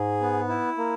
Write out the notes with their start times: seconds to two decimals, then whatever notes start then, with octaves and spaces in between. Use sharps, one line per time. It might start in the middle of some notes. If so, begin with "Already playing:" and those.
Already playing: G#2 G#4
0.21 B3
0.49 E4
0.78 A#3